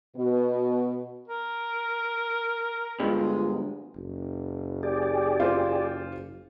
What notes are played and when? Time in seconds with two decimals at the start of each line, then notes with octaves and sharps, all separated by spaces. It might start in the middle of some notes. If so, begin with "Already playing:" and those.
0.15 B2
1.28 A#4
3.00 D2 G2 G#3 F4
3.96 F#1
4.83 G4 G#4 D5
5.40 F4 C5